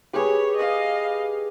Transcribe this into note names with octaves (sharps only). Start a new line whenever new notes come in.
G4 G#4 B4 C#5
D#5 F5